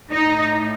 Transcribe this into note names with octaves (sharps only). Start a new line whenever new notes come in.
A2 D#4